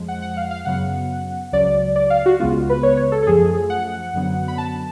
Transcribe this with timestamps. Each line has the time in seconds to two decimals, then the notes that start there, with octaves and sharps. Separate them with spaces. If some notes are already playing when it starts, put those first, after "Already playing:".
Already playing: F2 F3 G#3
0.08 F#5
0.22 F#5
0.37 F5
0.51 F5
0.65 F#2 C#3 F#3 B3 F#5
1.52 C#2 C#3 F#3 D5
1.96 D5
2.10 F5
2.26 F#4
2.40 C#2 C#3 G#3 B3 F4
2.69 B4
2.83 C#5
2.97 C#5
3.12 A4
3.23 A4
3.27 F#2 F3 A3 G#4
3.70 F#5
4.13 F#2 D3 F#3 B3
4.48 B5
4.58 A5